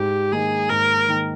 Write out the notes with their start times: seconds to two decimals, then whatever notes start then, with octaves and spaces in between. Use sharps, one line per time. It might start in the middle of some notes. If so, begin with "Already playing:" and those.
Already playing: G#2 G4
0.32 D#3 A#3 D#4 G#4
0.70 G#2 A#4
1.08 D#3 A#3 D#4